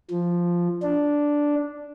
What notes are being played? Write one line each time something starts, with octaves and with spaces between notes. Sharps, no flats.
F3
D4